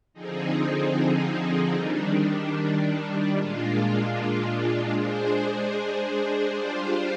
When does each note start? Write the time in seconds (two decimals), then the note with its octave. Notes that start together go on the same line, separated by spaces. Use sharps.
0.13 D3 F3 C4 D#4 G#4
1.73 D#3 G3 D4
3.33 A#2 G#3 D4 F4
4.93 G#3 D4 G#4 C5
6.52 G3 D4 F4 C5